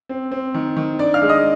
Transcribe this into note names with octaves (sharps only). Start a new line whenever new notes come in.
C4
C4
D#3
D#3
D4 D5 D6
F5 F6
G#3
D#5 D#6